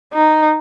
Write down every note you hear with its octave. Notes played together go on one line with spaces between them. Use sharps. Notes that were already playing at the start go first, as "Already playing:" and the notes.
D#4